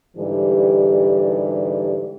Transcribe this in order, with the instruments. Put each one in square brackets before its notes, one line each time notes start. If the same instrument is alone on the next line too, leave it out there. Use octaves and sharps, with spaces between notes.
[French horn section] G#2 D3 E3 G3 G4